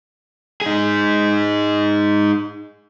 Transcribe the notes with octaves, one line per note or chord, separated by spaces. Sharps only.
D#4 G#4